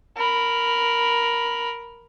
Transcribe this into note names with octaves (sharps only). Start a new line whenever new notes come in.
A#4 B5